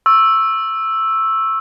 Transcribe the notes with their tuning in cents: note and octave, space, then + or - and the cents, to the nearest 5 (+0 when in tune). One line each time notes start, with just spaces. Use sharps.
C#6 -20 E6 +0